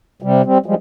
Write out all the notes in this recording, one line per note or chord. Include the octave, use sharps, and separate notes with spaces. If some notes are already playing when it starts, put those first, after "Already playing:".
C3 G3
G3 C4
F3 G3 G#3